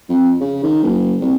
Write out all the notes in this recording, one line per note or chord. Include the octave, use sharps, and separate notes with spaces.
F2
C#3
D#3
F#1
C2